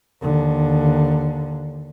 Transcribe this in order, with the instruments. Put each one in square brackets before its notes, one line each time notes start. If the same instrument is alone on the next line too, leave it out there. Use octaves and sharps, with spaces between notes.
[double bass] D#2 D3